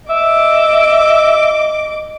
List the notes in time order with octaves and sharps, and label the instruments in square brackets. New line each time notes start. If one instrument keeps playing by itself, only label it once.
[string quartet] D#5 D6 [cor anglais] E5